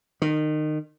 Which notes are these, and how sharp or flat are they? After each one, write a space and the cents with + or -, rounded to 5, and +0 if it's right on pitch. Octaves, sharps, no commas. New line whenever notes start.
D#3 -25